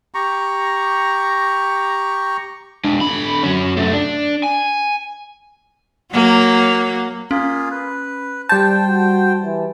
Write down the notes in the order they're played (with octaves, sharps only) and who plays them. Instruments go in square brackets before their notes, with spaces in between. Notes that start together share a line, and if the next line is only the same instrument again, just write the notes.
[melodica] G4 A#5 C#6
[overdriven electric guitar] G#3 D4
D3 B5
F#3 C#4
F#2 A3
D4
G#5
[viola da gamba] F#3 A#3
[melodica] A#3 F4 G#4 [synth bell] C#4
[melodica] B4
[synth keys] G3 A5 [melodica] C5 G5 [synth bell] G6
[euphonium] F#4
E3